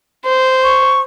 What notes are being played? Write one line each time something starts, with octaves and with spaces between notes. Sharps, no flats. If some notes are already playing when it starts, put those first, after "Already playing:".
C5
C#6